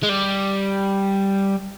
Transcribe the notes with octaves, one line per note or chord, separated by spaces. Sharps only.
G#3
G3